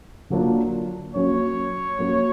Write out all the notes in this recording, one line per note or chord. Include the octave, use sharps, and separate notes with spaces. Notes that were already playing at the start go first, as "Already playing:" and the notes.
D3 F#3 A#3 D4 F4
F#3 A#3 C#4 F#4 C#5
F#3 A#3 C#4 F#4